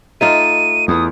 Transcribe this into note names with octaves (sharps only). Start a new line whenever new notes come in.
A3 D#4 F4 D#7
E2 D#6